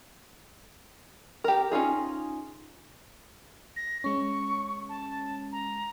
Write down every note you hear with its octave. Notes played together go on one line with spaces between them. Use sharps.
G4 A#4
C#4 D#4 F4 G#4
A#6
G#3 C#4 C#6
A5
A#5